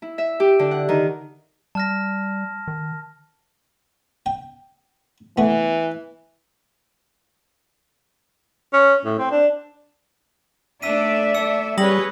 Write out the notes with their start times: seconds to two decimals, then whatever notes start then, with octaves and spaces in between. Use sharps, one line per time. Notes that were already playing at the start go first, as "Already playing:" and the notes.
0.02 E4
0.18 E5
0.40 G4
0.59 D3
0.71 F#5
0.89 D#3
1.75 G3 A5 F6 A#6
2.68 D#3
4.26 G5
5.38 E3 A3 B3
8.73 C#4
9.05 A2
9.18 C4
9.31 D4
10.82 A3 D4 A4 D5 E5 E6 B6 D#7
11.35 A3 A4 E6 C#7
11.78 G3 C#4 G#4 B4 C#5 D#6 A#6 F#7